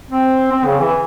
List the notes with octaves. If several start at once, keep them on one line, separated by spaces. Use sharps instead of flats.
C4
C4
C#3
E3